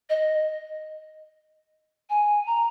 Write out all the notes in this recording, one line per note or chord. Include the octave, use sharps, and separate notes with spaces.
D#5
G#5
A#5